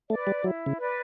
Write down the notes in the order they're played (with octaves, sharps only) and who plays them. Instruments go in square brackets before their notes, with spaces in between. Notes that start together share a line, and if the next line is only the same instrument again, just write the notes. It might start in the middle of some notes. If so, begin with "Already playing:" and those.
[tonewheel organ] A3 [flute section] D5
[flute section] B4
[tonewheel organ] G3
[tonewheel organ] F#3 [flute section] E4
[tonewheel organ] C#3
[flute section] B4 D5